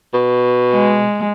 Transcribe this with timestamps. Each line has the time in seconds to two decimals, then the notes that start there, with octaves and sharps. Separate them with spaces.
0.14 B2
0.72 G#3